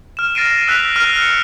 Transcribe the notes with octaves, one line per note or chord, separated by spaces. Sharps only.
F6 E7
F6 A6 A#6 C7 D7 D#7
E6 F#6 B6 F7
F6
C#7